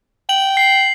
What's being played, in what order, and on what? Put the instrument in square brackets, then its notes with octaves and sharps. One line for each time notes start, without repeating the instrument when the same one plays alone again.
[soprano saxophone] G5 [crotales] F#7
[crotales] C7